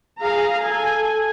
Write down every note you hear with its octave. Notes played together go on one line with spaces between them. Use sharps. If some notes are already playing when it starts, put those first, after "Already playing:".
G#4 F5 A#5
A4 G#5